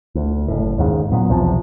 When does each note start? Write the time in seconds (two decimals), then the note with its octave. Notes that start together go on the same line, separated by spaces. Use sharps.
0.15 D2
0.48 F#1 A2
0.78 D#2 G#2 C#3
1.11 A#2 F#3 B3
1.29 B1 E2 C3 F3